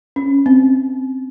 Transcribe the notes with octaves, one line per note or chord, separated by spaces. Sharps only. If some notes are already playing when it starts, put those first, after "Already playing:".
C#4
C4